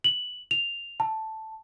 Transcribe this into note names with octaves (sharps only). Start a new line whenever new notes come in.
F#7
F7
A5